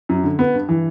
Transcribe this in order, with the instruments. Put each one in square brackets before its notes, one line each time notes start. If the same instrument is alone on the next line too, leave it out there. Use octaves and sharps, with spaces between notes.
[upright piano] F#2
D3
B3
G2
E3